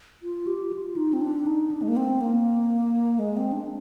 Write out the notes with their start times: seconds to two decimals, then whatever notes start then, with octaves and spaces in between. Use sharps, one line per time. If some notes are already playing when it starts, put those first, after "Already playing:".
0.22 F4
0.47 G4
0.73 F4
0.96 D#4
1.13 C4
1.21 D4
1.46 D#4
1.71 D4
1.82 G#3
1.88 A#3
1.97 C4
2.21 A#3
3.19 G#3
3.37 C4
3.52 D4